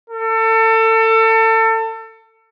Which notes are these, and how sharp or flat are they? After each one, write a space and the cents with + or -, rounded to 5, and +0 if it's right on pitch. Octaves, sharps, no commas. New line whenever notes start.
A4 +30